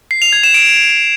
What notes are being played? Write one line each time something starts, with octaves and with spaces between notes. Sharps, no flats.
C7
F7
G#6
E7
D7